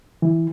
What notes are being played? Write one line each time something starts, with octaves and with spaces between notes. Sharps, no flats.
E3